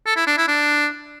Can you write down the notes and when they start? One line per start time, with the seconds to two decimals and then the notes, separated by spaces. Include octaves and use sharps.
0.06 A4
0.16 E4
0.27 D4
0.37 E4
0.47 D4